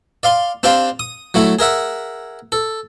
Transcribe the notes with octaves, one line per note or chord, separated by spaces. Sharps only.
D5 F5 C6
C4 D4 G4 D5 F5 C6
D#6
F#3 A3 E4
G#4 A#4 E5 F#5
A4